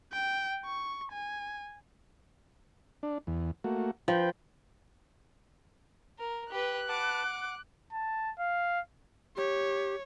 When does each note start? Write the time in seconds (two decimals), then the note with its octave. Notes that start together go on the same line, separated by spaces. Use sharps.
0.13 G5
0.66 C#6
1.12 G#5
3.03 D4
3.27 E2
3.64 A3 A#3 F#4
4.08 F3 B4 G5
6.19 A#4
6.51 G4 B4 F#6
6.89 B4 F#5 A5 D6
7.25 F#5
7.93 A5
8.39 F5
9.37 G4 C#5